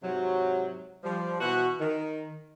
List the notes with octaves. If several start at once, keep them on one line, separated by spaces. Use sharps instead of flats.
G#2 C3 F#3
F3 G3
B2 E3 F#4
D#3